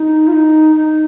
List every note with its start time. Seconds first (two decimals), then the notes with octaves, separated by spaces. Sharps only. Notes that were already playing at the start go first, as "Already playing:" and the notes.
Already playing: D#4
0.27 F4
0.33 D#4
0.75 D#4